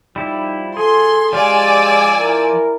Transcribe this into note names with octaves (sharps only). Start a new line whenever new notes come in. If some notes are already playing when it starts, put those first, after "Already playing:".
F3 G3 D#4 E4
G#4 A4 C6
F3 G#3 F4 G4 D5 G#5 E6
E4 A#4